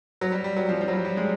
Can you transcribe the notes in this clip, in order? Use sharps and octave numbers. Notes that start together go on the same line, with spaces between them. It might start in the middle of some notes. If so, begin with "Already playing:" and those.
F#3
G3
G3
F#3
F3
F3
F#3
G3
G3
G#3